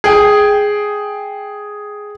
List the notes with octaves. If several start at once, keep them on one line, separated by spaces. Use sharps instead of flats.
G#4 G5